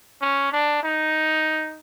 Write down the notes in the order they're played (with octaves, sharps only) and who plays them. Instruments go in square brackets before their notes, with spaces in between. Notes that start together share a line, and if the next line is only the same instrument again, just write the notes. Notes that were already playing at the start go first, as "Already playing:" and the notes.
[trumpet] C#4
D4
D#4